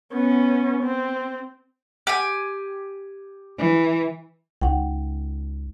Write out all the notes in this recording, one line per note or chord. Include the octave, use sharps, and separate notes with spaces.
B3 C#4
C4
G4 G#5
E3
C#2 D#4 F#5 G5